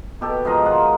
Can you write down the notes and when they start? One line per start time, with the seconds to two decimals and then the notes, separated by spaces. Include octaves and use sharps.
0.21 B2 G4 A4
0.45 G#2 F3 A#4 D#5
0.65 D#3 F4 F#5